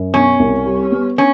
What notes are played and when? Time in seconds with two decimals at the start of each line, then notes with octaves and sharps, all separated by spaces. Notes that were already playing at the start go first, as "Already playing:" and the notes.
Already playing: F#2
0.14 B2 C#4
0.40 C2
0.66 G3
0.92 B3
1.18 C#4